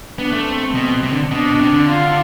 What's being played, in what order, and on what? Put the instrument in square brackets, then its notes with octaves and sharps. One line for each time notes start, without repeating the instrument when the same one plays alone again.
[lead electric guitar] B3 [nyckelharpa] D4
[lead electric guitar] A3
[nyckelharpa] C4
[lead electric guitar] B2
C3
D3
[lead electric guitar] B2 [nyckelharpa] D4
[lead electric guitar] B2
C3
D3
[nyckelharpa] F4